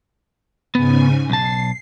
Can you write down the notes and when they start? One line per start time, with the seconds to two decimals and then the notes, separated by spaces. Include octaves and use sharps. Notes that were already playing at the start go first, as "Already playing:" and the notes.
0.75 G#2 C#3 B3 G#5
1.30 B1 A5 C7